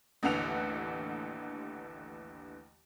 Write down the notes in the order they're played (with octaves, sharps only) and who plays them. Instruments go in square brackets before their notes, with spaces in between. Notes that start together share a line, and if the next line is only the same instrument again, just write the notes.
[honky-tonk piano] A1 D#2 D3 E3 F#5 F7